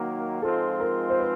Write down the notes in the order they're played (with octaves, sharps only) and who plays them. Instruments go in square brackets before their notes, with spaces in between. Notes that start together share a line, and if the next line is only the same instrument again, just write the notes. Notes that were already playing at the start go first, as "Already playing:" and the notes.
Already playing: [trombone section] D#3 F#3 A#3 D#4
[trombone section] G#2 F3 G#3 C4 F4 [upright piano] A4
[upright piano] A#4
C5
B4